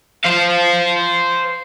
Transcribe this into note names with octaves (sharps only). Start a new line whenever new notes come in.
C5 F5